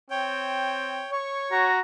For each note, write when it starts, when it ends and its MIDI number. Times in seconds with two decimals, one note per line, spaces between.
0.11 1.04 60
0.11 1.11 73
0.11 1.11 79
1.12 1.71 73
1.12 1.58 85
1.52 1.80 66
1.52 1.80 82